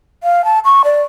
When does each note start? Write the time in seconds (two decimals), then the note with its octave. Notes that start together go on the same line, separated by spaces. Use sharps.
0.23 F5
0.45 A5
0.65 C#6
0.84 D5